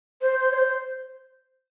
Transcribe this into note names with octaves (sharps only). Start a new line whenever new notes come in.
C5
C5
C#5
C5